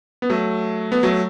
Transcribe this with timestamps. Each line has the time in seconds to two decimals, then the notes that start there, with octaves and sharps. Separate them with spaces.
0.22 B3
0.30 F#3 A3
0.92 B3
1.03 F#3 A3